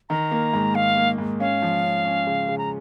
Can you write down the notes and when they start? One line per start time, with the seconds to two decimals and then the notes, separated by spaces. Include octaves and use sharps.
0.09 D#3 A#5
0.31 A#3
0.53 G#2
0.75 G#2 F5
0.97 A#3
1.18 G#2
1.40 C#4 F5
1.62 F3
1.83 C#4
2.05 C#4
2.27 C#3
2.48 C#3
2.58 A#5